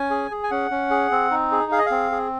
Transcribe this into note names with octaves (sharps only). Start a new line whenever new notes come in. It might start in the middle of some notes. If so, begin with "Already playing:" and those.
Already playing: C#4 G#5
G#4
G#4
G#5
C#4 F#5
C#4
G#4
C4
D#4
G#4
G#4 F5
D#5
C4 F5
G#4